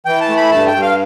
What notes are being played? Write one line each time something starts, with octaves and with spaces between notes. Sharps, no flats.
E3 G5
A5
A3
B5
G2 A5
G5
G2
F5